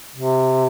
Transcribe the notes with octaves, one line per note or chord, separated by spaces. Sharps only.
C3